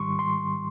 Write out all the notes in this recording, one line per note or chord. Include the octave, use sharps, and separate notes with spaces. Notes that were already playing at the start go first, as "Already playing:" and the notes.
Already playing: G#2 D#3 G3 C6 C#6
C6